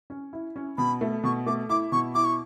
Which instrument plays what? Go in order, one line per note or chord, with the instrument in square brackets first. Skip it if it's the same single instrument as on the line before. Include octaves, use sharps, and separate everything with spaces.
[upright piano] C#4
E4
C#4
[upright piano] B2 [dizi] B5
[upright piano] A3
[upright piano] B2 [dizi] C#6
[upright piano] A3 [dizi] D6
[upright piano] E4 [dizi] D6
[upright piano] B2 [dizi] C#6
[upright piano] E4 [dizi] D6
[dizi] C#6